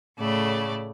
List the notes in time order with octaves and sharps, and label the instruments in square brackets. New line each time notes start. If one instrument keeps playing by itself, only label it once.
[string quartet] A2 C#3 A3 D5